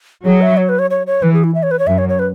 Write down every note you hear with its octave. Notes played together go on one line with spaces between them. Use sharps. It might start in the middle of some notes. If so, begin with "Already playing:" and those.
F#3 G#4
E5
C#5
B4
C#5
C#5
C#5
E3 B4
G#4
E4
E5
C#5
B4
C#5
F#2 E5
C#5
C#5
B4